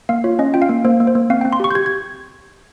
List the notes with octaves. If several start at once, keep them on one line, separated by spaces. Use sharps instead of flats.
A#3 F5
F4 C#5
C#4 D#5
F4 G5
F5
A#3
A#3 C5
A#3
C5
A#3
C4 F5
C4 G5
C6
G4 C#6
G6
G4 G#6
G#6